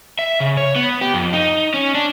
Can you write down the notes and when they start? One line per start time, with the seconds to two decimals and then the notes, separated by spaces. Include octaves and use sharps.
0.19 E5
0.40 C#3
0.57 C#5
0.76 B3
1.01 G4
1.14 F2
1.33 D#4
1.74 C#4
1.95 D4